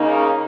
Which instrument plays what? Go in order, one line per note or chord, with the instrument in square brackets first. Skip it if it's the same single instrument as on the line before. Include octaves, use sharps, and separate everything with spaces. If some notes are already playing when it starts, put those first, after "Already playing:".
Already playing: [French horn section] C#3 A#3 D#4